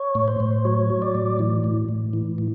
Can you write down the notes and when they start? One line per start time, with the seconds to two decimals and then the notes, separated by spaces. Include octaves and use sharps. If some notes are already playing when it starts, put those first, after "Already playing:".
Already playing: C#5
0.15 A2
0.28 C5
0.40 A2
0.65 F#3 C#5
0.90 F#3
1.02 D5
1.15 A2
1.39 E3
1.64 A2
1.88 A2
2.13 E3
2.38 A2